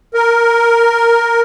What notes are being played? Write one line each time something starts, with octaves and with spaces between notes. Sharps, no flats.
A#4